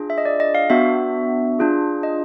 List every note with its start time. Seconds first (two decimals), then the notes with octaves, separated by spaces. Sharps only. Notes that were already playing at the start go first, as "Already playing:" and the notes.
Already playing: D4 F4 G#4
0.10 E5
0.18 D#5
0.25 D5
0.40 D#5
0.55 F5
0.70 B3 D4 F#4 E5
1.59 D4 F4 G#4
2.03 D#5